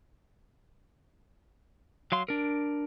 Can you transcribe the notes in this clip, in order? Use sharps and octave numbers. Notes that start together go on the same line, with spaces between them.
F#3 F5 C6
D4 A#4